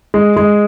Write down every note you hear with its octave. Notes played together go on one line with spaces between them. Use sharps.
G#3
G#3